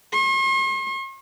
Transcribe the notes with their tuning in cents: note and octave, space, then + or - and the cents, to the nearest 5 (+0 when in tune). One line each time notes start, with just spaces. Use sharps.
C6 +45